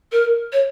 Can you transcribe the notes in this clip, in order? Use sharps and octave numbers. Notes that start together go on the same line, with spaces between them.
A#4
C#5